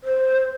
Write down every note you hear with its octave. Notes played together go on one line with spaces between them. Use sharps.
C5